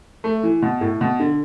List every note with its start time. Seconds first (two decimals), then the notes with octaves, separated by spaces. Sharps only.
0.24 A3
0.43 E3
0.62 B2
0.81 A2
1.01 B2
1.20 D3